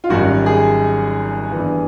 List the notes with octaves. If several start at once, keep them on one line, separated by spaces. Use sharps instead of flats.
F4
G#1 F#2 D#3 G3 F#4
G#4
G1 G2 E3